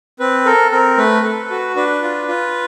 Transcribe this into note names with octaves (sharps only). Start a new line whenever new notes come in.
C4 B4
A4 A#4
C4 A#4
A3 B4
A4
F#4
D4 B4
F4
F4